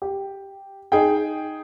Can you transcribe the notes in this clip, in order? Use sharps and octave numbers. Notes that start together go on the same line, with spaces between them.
G4
D#4 G#4 G5